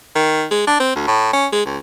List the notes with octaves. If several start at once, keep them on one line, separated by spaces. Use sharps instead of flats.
D#3
G#3
D4
C4
D2
A2
C#4
G#3
C#2